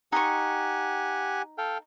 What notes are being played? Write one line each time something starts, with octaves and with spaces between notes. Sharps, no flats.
D#4 G4 F#5 G#5 C#6
A4 F5 G5